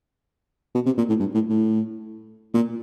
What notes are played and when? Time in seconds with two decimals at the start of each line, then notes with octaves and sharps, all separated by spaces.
0.75 B2
0.86 C3
0.98 A#2
1.09 A2
1.20 G2
1.34 A2
1.49 A2
2.54 A#2